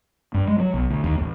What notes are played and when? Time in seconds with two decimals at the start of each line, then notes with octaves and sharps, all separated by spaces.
0.34 G2
0.48 G#3
0.60 F#3
0.74 B1
0.90 D2
1.04 D#2
1.20 A1